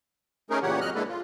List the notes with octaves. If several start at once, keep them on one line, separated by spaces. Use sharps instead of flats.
A3 C#4 D#4 G#4 A#4
A#2 C#3 E3 G4 C#5 F#5
F2 F#3 D#5 F6 F#6
G#3 A#3 D4 E4 A4 B4
F4